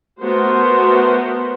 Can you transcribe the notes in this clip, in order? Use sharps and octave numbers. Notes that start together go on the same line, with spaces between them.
A3 B3 F#4 A#4 C5